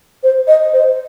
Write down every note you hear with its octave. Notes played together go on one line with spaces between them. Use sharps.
C5
D#5
C5